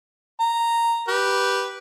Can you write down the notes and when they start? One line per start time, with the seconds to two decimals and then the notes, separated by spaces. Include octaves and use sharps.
0.40 A#5
1.08 G4 B4